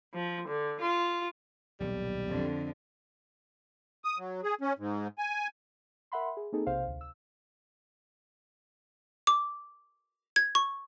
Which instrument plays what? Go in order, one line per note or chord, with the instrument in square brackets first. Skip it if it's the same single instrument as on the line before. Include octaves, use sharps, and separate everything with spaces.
[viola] F3
D3
F4
[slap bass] D#1 B1 D#3 [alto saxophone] G3
[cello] F2 D3
[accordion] D#6
F#3
G#4
C#4
G#2
G#5
[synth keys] A#4 E5 F#5 B5 C6
G#4
A#3 C4 D#4 G#4 A4
B1 C3 C5 F5
D2
E6
[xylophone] D6
G#6
C#6